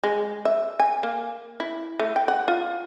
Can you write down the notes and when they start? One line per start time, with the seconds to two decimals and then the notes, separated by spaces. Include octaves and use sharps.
0.04 G#3
0.45 E5
0.80 G#5
1.03 A#3
1.60 E4
2.00 A3
2.16 G5
2.28 F#5
2.48 F4